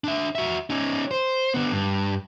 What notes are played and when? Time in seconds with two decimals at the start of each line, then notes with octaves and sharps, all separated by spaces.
0.04 D4 E5
0.35 F#4 E5
0.70 C#4 D#4
1.11 C5
1.54 D3 B3
1.72 G2